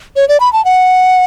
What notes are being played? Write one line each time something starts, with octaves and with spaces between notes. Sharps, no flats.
C#5
D5
B5
A5
F#5